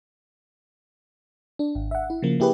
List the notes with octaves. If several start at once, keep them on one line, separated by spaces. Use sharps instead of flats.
D4
G#1
E5 F#5
E4
C#3 F3 A#3
A#3 E4 G4 G#4 B4